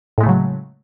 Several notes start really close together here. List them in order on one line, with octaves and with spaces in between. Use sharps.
A2 G#3 A3 C#3 F#3